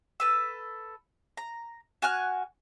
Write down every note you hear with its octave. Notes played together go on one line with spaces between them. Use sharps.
A4 B4 E6
A#5
F#4 G#5 F6 F#6